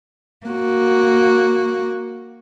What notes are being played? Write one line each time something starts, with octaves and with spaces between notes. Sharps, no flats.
A#3 F#4